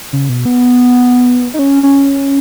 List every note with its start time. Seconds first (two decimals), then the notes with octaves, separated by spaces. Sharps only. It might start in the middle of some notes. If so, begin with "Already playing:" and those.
0.13 C#3
0.29 B2
0.45 B3
1.54 D#4
1.59 C#4
1.83 C#4